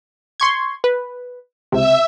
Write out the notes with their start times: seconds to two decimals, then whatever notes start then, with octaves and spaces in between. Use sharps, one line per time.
0.40 C6 C#6 G#6
0.84 B4
1.72 C#2 C3 E5